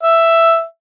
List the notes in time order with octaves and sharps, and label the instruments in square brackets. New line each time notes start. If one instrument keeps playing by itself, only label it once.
[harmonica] E5